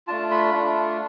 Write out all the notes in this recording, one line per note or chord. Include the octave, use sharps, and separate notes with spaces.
A3 D4 F4 A5
B5
A3 D4 F4